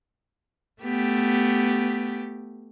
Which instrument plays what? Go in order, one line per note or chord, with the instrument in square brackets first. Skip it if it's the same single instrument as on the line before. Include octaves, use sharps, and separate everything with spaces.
[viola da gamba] A3 B3 G4